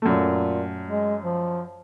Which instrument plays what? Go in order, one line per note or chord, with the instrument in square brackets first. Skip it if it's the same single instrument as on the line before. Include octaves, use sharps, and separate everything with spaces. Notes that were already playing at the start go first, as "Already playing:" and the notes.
[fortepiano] F#2 A3 [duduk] A#2
[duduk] G#3
F3